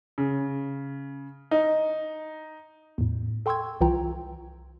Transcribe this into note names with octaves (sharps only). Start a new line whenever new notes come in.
C#3
D#4
E2 A2
A4 G5 C6 C#6 E6 G#6
C2 E3 F4 G5 A#5